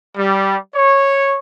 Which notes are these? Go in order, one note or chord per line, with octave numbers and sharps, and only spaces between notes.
G3
C#5